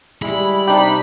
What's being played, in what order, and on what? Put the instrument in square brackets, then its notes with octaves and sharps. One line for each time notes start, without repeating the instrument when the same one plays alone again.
[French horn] G3 [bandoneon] G#3 E4 [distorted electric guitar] B5
[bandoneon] C3 D#4 [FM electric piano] D4 G4